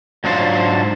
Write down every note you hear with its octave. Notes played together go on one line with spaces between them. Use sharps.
G#2 F#3 D4 F4 C5